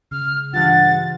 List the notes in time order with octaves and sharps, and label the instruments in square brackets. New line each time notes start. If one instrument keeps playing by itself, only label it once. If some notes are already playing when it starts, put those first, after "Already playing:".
[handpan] C#3 [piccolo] F6
[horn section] G2 F#5 [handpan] E3 F4 [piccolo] A6